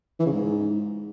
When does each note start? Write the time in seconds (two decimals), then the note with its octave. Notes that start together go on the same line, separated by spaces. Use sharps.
0.19 E3
0.26 C#3
0.32 G#2